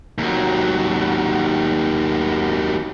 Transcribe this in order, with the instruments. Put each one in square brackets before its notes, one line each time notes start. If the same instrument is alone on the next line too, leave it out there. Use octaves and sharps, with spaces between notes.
[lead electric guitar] D#2 F#3